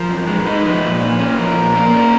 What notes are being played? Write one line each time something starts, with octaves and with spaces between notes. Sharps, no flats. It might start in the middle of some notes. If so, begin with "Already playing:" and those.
Already playing: F3 A#4
F#2
G#3 B4
D#4
F3
A#2
A#3
C#4
F3 A#4
A#2
A#3
C#4